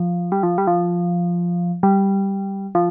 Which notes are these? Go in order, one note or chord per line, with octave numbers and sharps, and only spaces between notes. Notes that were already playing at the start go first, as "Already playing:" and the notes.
Already playing: F3
G3
F3
G3
F3
G3
F3